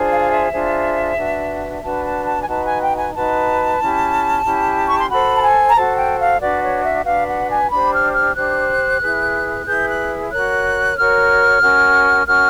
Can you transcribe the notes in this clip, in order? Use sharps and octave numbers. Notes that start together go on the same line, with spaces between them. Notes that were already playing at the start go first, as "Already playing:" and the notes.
Already playing: D4 F4 G#4 C5
F5
F5
E5
D4 F4 G#4 C5
D4 F#4 B4
D4 F#4 B4 A5
A5
A5
G#5
D#4 F#4 B4 A5
G#5
G5
G#5
D#4 F#4 B4 A5
C#4 E4 G4
C#4 E4 G4
C#6
C6
F#4 A4 C5 B5
A5
G#5
A#5
F#4 A4 C5 A5
G5
F5
D4 F#4 B4 D5
C#5
E5
D4 F#4 B4 F5
F#5
G#5
D4 G4 C5 B5
F6
F6
D4 G4 C5 F#6
E4 G#4 B4
E4 G#4 B4 G6
F#6
F#4 A#4 C#5 F#6
F#4 A#4 C#5 F6
C#4 F#4 A#4
C#4 F#4 A#4 F6